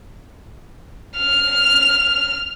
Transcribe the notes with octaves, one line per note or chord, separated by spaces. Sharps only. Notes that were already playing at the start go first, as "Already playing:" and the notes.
F6